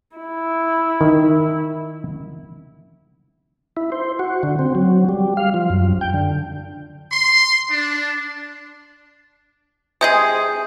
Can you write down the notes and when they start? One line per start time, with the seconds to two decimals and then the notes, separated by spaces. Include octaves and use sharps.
0.17 E4
1.01 D#3
3.77 E4
3.92 C5
4.19 F#4
4.43 D3
4.59 C4
4.75 F#3
5.09 G3
5.37 F5
5.54 F3
5.70 F#2
6.01 G5
6.14 D3
7.11 C6
7.71 D4
10.01 C3 G#3 G#4 D#6 G6